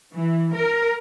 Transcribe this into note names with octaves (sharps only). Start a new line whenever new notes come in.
E3
A#4